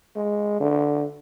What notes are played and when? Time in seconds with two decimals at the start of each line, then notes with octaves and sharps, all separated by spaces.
0.16 G#3
0.60 D3